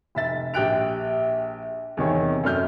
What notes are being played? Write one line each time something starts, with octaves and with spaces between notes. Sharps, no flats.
F1 E5 A6
A#1 G4 G5 F#6 D7 F7
E2 C3 D#3 C#5
F#2 A3 D5 F6 G6